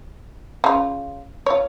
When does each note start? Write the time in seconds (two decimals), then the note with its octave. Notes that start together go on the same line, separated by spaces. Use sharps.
0.64 C#3 F4
1.46 F4 C#5